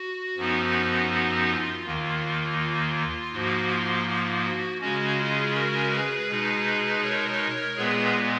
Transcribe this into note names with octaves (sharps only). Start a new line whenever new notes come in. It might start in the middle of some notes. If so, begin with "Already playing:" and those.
Already playing: F#4
F#2 F3 B3 D#4
F#4
F4
D#2 D#3 A#3
F4
G#2 F3 A#3 F#4
F4
F4
F#4
C#3 G#3 C#4 F#4
F4 G#4
F#4 A#4
G#4 B4
B2 G#3 D#4
A#4 C#5
A#2 G#3 B3 G#4 B4